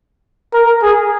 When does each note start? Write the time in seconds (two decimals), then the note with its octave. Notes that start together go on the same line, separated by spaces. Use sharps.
0.53 A#4
0.82 G#4